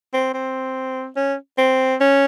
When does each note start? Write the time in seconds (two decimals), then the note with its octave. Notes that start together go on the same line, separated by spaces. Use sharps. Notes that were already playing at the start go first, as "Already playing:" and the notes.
0.13 C4
0.34 C4
1.16 C#4
1.58 C4
2.00 C#4